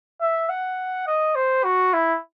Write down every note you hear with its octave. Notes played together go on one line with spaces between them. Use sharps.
E5
F#5
D#5
C5
F#4
E4